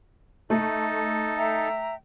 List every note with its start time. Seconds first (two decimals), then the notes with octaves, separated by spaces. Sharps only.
0.50 A3 D#4 A4
1.36 E5 G5 A#5